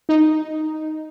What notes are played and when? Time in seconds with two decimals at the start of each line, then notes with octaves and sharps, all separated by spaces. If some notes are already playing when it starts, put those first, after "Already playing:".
0.09 D#4